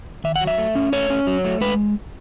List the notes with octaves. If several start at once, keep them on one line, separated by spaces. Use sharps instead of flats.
D#3 E5
F#5
F#3
E5
A3
C#4
A3 C#5
C#4
F#3
A3
G#3 B4